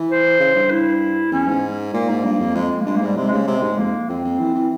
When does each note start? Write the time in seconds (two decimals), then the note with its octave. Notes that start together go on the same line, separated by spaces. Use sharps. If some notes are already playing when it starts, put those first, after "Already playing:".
Already playing: E3
0.10 C5
0.40 C#3
0.55 G2
0.71 E4
1.32 E2 C#4
1.48 G#2
1.94 A#2 A#3
2.09 G#2
2.25 G2
2.40 F2
2.55 F2 G#3
2.81 A#3
2.86 G2 G#3
2.96 G#2 A#3
3.06 G3
3.17 C3 G#3
3.27 C#3 G#3
3.37 A#3
3.47 C3 G#3
3.63 G#2
3.78 F2 A#3
4.09 F2 C4
4.25 F2
4.40 E3
4.55 E3